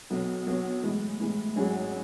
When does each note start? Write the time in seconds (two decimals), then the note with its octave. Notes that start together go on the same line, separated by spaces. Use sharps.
0.10 B1 B2 F#3
0.47 B1 B2 F#3
0.83 A2 E3 G#3
1.20 A2 E3 G#3
1.56 G#1 G#2 F#3 C#4 G#4